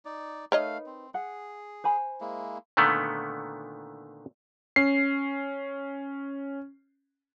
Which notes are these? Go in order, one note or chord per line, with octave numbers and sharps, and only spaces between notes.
D#4 D5
A3 D#4 A#4 B4 C#5 D#5 F5
C4
G#4 F#5
C5 G#5 B5
G#3 A#3 E4
A#2 D3 D#3 A3 B3
C#4 C7